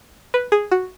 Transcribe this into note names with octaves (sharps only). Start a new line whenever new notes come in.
B4
G#4
F#4